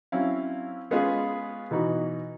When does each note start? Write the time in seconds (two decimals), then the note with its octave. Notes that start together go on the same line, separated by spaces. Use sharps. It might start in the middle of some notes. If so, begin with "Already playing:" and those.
0.12 F#3 C4 C#4 E4 F5
0.91 G#3 B3 C#4 F4 G#4 B4
1.71 B2 E3 D#4 F#4